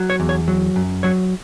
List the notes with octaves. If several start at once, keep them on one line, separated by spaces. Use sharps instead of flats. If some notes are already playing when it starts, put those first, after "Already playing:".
Already playing: F#3
C#5
E2
C#5
F#3
F#2
F#3 C#5